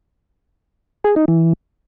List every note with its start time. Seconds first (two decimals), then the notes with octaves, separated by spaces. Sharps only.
1.04 G#4
1.16 D#4
1.28 E3